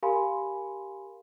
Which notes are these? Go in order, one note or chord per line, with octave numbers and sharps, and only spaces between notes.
G4 A#4 F5 G#5 B5 C6